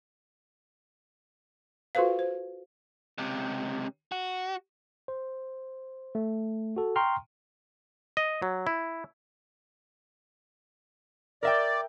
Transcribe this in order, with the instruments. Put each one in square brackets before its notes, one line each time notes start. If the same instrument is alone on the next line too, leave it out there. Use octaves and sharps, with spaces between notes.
[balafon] F4 F#4 A4 B4 C5 F5
C5
[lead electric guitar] C#2 C3
F#4
[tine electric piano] C5
A3
F#4 A4
G5 A#5 C6 C#6 F6
[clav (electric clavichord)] D#5
F#3
E4
[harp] A#4 E5 G5 [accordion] D5